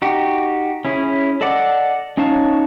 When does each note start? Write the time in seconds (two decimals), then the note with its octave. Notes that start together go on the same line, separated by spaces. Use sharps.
0.02 D#4 F#4 G4
0.85 C#4 E4 G#4
1.41 A4 D5 D#5 F#5 D6
2.17 C#4 D#4 C#5 F5 A5